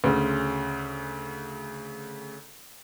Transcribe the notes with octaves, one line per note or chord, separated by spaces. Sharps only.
D2 C#3